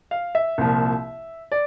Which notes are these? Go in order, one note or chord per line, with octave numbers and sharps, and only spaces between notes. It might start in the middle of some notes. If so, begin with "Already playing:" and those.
F5
E5
C2 A#2 F3
D5